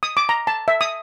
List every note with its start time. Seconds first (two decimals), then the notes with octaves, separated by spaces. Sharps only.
0.03 D#6
0.17 D6
0.29 A#5
0.47 A5
0.68 E5
0.81 D#6